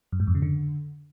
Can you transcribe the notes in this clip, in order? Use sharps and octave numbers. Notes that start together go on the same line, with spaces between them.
F#2
G#2
F2
C#3
D3